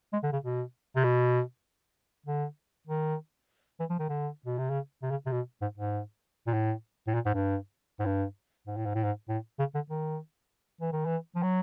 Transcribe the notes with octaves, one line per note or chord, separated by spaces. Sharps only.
G#3
D3
C#3
B2
C3
B2
D3
D#3
E3
F3
D#3
D3
B2
C3
C#3
C3
C#3
C3
B2
G#2
G#2
A#2
A2
A2
A#2
G#2
G2
G#2
G2
G#2
A2
G#2
A2
G#2
A2
C#3
D3
D#3
E3
D#3
E3
F3
F#3